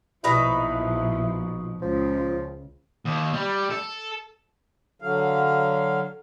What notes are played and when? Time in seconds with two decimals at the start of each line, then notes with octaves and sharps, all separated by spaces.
0.24 A#1 B2 F3 D#4 E4 B4
1.82 C#2 F3
3.05 D#2
3.33 G3
3.70 A4
5.02 D3 F#3 F5